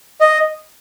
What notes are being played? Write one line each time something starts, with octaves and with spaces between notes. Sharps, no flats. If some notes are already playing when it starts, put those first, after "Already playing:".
D#5